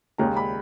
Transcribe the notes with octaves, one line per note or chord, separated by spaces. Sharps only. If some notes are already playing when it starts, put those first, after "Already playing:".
D#2 C#3 G#3 C#4 A#5
B5